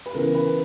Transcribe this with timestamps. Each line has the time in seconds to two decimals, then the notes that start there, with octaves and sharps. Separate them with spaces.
0.06 B4
0.14 C#3 E3 B3 A#4
0.35 B4